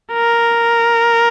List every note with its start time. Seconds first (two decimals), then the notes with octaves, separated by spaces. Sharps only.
0.13 A#4